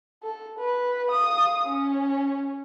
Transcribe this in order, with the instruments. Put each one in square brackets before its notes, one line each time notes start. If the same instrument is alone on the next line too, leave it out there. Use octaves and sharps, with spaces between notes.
[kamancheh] A4
B4
F5 D#6
C#4